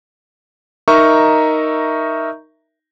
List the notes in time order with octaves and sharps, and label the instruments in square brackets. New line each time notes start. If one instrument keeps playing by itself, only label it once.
[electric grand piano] D#4 A#4 D#5 E5 A#5 C#6